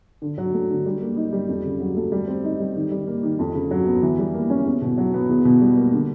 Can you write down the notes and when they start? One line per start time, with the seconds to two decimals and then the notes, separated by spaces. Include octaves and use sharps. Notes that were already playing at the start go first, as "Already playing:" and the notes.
0.22 D3
0.38 F#3
0.54 A3
0.70 D3
0.86 G3
1.01 A#3
1.16 D#4
1.33 G3
1.49 F2
1.65 C#3
1.80 F#3
1.97 A3
2.12 G3
2.28 C4
2.44 D#4
2.60 G3
2.76 D#3
2.91 G3
3.07 A#3
3.23 D#3
3.39 F2
3.55 C#3
3.71 F#3
3.86 B3
4.02 E3
4.18 G3
4.34 A#3
4.50 C#4
4.66 E2
4.82 B2
4.98 F#3
5.14 B3
5.29 E2
5.45 B2
5.61 G3
5.77 A#3
5.93 D3